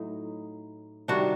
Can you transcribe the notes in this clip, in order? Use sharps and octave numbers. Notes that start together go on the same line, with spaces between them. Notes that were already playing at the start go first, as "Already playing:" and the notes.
Already playing: A2 F#3 D#4
C3 D#3 G3 D4 F#4